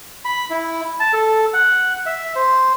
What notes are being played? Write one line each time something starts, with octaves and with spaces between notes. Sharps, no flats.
B5
E4
A5
A4
F#5
E5
C5